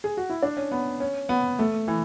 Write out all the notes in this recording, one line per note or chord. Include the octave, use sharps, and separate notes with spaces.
G#4
F#4
E4
D4
C#4
B3
C#4
B3
A3
E3